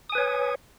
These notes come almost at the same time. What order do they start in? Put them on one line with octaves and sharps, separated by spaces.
D#6 G#5 B4 C#5